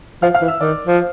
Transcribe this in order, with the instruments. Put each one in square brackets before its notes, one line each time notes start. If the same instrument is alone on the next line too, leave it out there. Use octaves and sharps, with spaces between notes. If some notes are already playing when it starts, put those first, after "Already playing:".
[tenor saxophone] F3 [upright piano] F5 F6
[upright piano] F5 F6
[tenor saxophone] E3
[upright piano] E5 E6
[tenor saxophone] D#3 [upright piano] D5 D6
[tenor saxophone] F3